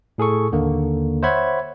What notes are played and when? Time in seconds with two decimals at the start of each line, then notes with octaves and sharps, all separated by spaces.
0.18 A2 G#4 A4 C#6
0.52 D#2 D3 A#3
1.23 C5 C#5 E5 F#5 B5 G#6